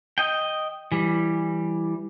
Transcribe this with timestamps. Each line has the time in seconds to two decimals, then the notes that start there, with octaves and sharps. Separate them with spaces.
0.18 D#5 G5
0.92 E3 G3